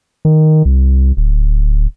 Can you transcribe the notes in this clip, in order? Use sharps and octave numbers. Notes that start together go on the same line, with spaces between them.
D#3
C2
D1